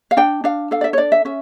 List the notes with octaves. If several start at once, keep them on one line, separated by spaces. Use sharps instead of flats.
F5
D4 G5
D4 F5
A4 F5
D5
E5
C#5
D4 D5
E5
C#4 E5